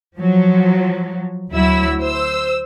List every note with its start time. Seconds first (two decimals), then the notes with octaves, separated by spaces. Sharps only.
0.16 F3 F#3
1.53 D2 F#3 E4 E6
2.01 C5 E6